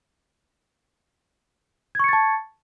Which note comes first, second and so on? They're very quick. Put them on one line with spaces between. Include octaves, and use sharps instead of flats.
G#6 C#6 C#7 A6 A5